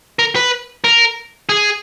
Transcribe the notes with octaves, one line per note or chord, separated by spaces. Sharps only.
A#4
B4
A#4
G#4